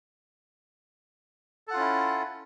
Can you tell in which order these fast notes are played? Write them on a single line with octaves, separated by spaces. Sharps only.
A4 F#5 F4 C#4 E4